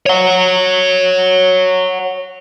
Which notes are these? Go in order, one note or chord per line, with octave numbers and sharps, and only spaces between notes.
C#5 F#5